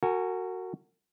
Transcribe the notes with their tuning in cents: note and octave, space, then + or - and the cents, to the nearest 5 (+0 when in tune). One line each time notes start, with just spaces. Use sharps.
F#4 +0 A#4 -40 G#5 -10